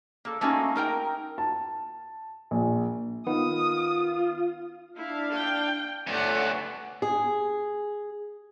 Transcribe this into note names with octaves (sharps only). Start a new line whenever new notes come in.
A#3 A4
A3 A#3 C#4 D#4 F#4
D#4 A#4 G5 A#5
A5
A#1
D#3 B3 F4 D#6
D4 E4 F5
G5
D2 B3 A4 C#5 D5 F#5
G#4